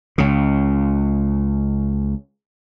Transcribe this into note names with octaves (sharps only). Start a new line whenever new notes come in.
C#2 C#3